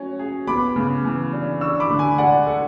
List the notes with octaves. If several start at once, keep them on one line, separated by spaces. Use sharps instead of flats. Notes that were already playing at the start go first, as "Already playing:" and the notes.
Already playing: F#3 C#4
G#4
B3 B5 D6
C#3
E3
D4
D4 C#6 E6
B5 D6
D3
G#5 B5
G#3 D5 F#5
A4